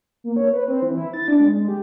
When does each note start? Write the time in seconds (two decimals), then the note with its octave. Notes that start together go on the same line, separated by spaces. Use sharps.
0.24 A#3
0.36 C#5
0.53 B4
0.68 C4
0.82 E3
0.97 E4
1.14 A6
1.28 D4
1.40 G#3
1.55 G#3
1.68 G4